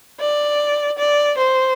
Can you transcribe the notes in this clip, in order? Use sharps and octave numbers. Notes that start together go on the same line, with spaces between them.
D5
D5
C5